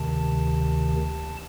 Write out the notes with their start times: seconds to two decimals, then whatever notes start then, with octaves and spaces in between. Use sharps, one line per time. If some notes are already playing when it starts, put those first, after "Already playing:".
Already playing: D2 C3 D#3 A5